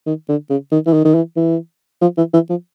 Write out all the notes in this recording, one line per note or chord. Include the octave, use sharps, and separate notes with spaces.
D#3
D3
C#3
D#3
E3
D#3
D#3
E3
E3
F3
E3
E3
F3